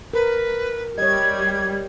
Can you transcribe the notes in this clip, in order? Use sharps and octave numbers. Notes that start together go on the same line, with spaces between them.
A#4 B4
G3 C#5 D#5 G#6